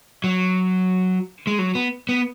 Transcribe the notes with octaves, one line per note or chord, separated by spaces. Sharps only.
F#3
G#3
F#3
B3
B3